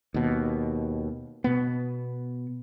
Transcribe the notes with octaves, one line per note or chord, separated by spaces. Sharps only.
D#2 B2
B2 B3